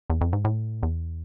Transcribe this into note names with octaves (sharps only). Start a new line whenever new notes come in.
E2
F2
G#2
A2
E2